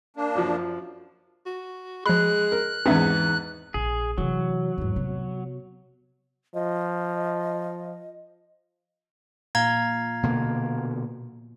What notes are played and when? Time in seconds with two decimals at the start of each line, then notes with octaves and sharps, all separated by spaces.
0.17 A#3 D4
0.35 F#2 F3
1.46 F#4
2.06 F3 G#3 B5 F#6
2.52 A#4
2.86 E2 G#2 B3 C4 D4 E5
3.74 A#1 G#4
4.18 C3 E3 F#3
4.78 E2 G#2
4.96 C3 B3
6.54 F3 D#5
9.55 A#2 F5 A#5 G#6
10.23 B2 D3 A#3